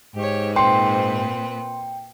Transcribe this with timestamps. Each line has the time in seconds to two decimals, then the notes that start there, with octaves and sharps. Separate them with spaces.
0.16 G#2 G4 C#5
0.56 A#2 C4 B4 G5 C6